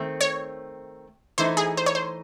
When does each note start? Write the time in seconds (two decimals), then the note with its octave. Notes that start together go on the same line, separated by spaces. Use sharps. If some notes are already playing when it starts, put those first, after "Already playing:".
Already playing: D#3 A3 C4
0.21 C#5
1.38 E3 A3 D#4 C5
1.57 G#4
1.77 C5
1.86 C#5
1.95 C5